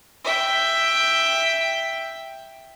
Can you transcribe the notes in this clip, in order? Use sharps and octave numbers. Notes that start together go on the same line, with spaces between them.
E5 G5